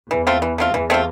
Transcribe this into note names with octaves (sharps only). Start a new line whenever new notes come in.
E2 E3
A3 C4 F4
E3
A3 C4 F4
E2 E3
A3 C4 F4